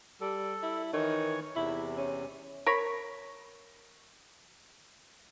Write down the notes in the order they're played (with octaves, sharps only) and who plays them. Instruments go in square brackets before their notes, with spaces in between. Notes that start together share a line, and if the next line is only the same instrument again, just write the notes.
[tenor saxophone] G3 [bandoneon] A4
[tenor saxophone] E4
[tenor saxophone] D#3 [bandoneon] E3 C#5 C#6
[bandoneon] E2 C3 [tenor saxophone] E4
[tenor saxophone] C#4
[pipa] A#4 C#5 B5